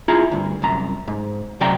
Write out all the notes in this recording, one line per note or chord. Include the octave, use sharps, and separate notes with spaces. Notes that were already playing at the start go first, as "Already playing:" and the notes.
E4 F4 G#4 A#5
D2 G2
C2 F#2 A#5
G#2
C3 F#3 D5 G5 A#5